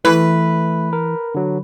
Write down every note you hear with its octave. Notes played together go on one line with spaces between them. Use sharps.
E3 A3 B4
A#4
D3 F#3